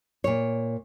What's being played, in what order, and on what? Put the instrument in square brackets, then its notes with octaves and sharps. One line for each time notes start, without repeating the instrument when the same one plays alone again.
[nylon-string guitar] A#2 C#5